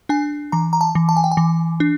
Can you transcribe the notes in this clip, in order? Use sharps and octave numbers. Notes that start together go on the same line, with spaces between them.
D4 G#5
E3 A#5
A#5
A5
E3
A5
G#5
G5
G#5
E3
D4